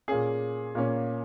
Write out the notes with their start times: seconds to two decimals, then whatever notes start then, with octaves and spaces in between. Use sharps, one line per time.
0.08 A#2 A#3 C#4 G#4
0.75 A#2 A#3 C#4